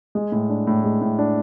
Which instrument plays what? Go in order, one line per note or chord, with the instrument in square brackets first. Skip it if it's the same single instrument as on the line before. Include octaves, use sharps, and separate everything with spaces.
[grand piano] G#3
A2
D4
A2
G#3
A2
D4